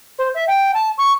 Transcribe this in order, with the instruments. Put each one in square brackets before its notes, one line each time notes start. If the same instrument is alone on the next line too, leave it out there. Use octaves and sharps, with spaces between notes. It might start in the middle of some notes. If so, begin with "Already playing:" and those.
[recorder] C5
E5
G5
A5
C#6